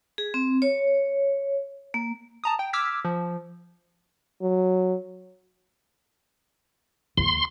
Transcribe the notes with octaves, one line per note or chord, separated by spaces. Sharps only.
G#4
C4
C#5
A#3
A5 A#5 D#6
G5
D6 E6 F6 G#6 B6
F3
F#3
D#2 C6